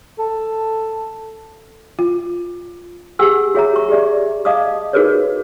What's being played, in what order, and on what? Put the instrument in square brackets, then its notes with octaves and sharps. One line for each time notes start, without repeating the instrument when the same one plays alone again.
[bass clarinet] A4
[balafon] F4
[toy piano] G4 G#4 F#5 G#5 E6
F#4 G#4 C#5 E5 G#5 A#5
C#6
G4 G#4 D5 E5
D#5 F5 A5 D6 D#6
D#4 F#4 G#4 A#4 B4 C#5